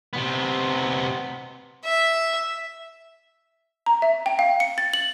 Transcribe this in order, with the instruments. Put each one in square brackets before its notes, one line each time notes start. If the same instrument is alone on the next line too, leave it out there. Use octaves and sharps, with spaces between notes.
[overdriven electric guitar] C3 B3
[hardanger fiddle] E5
[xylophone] A#5
E5
G5
F5
C#7
A6
F#7